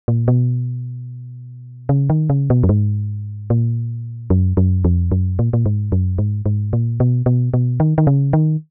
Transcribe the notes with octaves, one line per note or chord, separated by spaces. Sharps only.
A#2
B2
C#3
D#3
C#3
B2
F#2
G#2
A#2
F#2
F#2
F2
F#2
A#2
A#2
G#2
F#2
G#2
G#2
A#2
B2
B2
B2
D#3
D#3
C#3
D#3